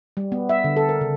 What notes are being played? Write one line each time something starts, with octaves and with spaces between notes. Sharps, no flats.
G3
B3
E5
D3
A4
A#4
C#3